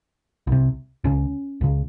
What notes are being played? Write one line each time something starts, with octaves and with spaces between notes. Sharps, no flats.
C2 C3
C#2 C#3 C#4
C#2 C#3